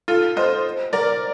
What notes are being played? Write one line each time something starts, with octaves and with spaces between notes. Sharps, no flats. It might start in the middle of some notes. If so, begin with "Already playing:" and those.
F4 A4
C5 D#5
A#4 D5